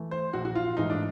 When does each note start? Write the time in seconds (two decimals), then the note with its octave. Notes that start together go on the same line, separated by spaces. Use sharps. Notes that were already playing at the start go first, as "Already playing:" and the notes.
Already playing: E3 A3
0.11 C5
0.33 A#1 F#4
0.45 F#4
0.55 F4
0.77 G#2 E3 A3 D#4
0.90 D4